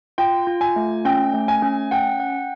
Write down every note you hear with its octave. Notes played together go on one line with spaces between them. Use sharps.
F4 G5
F4
G#5
A3
C#4 G5
A3
G#5
C#4
F#5 G5
F#5